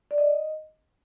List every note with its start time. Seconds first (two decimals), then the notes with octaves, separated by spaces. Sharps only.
0.11 D5
0.18 D#5